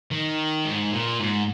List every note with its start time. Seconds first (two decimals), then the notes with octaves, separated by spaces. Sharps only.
0.11 D#3
0.65 G#2
0.93 A#2
1.19 G#2